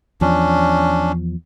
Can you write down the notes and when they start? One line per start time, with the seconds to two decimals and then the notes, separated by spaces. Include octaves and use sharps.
0.21 E2 F3 C#4 D4